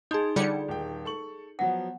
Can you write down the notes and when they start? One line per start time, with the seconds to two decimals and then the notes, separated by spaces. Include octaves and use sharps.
0.11 D#4 G#4 A5 C6 G6
0.36 D3 G3 F4 D5 C#7
0.68 D#1 G5
1.05 A4 C#6 F#7
1.59 F3 F#3 B3 F#5